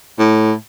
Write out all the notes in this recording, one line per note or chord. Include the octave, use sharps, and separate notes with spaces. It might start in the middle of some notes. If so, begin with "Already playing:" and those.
A2